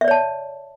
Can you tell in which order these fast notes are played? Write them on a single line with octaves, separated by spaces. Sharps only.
E5 D5 C#5 A5